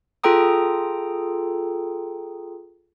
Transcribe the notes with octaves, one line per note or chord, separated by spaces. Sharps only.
F4 G#4 A4 G5 A#5 D#6